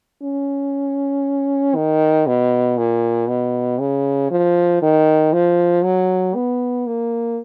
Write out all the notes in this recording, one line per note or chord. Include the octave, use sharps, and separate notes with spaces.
C#4
D#3
B2
A#2
B2
C#3
F3
D#3
F3
F#3
B3
A#3